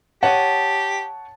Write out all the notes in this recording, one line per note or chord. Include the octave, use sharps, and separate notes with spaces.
G4 C#5 F#5 A5 D#6